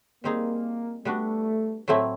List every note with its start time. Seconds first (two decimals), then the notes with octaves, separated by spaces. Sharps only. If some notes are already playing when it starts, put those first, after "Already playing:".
0.24 G3 A#3 C4 D#4 G#4
1.05 G3 A3 B3 D4 F#4
1.88 A2 F#3 A3 C4 E4